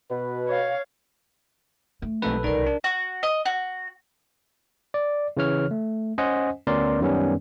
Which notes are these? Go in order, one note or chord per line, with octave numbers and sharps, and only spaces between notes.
B2 B4
C#5 F5
A3
B1 F2 G#2 D#3 A4 B4
C2 D#3 C#4 A#4 D5
D4
F#4
D#5
F#4
D5
C#3 E3 C#5 F6
A3
C#4 C5 D#5 F#5 G#5
D2 B3 C#4 A#4 D5 C6
F#2 D#3 G3 B3 C#4